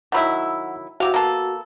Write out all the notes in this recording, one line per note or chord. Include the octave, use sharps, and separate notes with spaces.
D#3 F#3 E4 F#5 B5 E6
C3 F#4 G4 F5
A#3 B3 A4